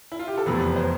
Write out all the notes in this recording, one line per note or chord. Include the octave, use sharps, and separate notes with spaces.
E4
F4
G4
A4
F1 E2 C3 F3 B4
B4
C5